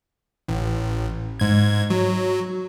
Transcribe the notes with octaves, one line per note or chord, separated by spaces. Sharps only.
A1
G#2 G#6
F#3